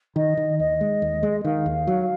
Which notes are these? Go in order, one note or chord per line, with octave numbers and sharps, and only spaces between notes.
D#3 D#5
D#3
D#2 D#5
G#3
D#2
G#3
D#3 F5
D#2
F#3